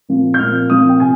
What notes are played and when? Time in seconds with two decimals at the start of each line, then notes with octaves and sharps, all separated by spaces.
0.09 A#2 F3 C4
0.34 G6
0.39 A#2 F3 C4 F6
0.70 A#2 F3 C4 D#6
0.89 G5
1.00 C3 G#5